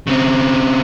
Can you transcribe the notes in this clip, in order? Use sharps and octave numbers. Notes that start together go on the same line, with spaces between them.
C#3 C4